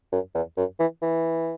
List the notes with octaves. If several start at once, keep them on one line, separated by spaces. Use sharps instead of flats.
F#2
E2
F#2
E3
E3